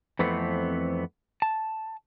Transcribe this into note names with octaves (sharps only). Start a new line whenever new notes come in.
F2 E3 A3 B3 C4
A5